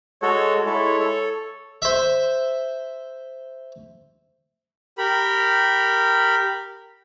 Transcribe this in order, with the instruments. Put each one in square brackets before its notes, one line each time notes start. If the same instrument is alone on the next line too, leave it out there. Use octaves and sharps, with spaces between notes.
[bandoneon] G#3 F#4 A4 [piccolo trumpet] C#5
[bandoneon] G#3 E4 A4 [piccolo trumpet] C#5
[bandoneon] A4
[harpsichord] C5 E5
[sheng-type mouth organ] G4 A#4 B5